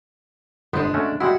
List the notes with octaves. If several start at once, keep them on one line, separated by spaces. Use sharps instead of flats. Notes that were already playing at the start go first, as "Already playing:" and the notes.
G1 G#3 B3 D4 C5
A3 C#4 F#4
G3 G#3 E4 F#4